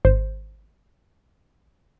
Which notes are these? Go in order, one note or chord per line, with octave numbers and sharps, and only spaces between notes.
G#1 C5